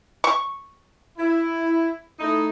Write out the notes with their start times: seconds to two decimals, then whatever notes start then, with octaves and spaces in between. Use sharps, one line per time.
0.24 C#6
1.18 E4
2.19 A3 D#4 E4